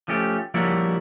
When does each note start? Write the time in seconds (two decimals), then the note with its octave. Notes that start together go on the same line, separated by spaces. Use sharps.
0.08 F3 A3 C#4 G4
0.54 F3 G3 A#3 E4 F#4 C#5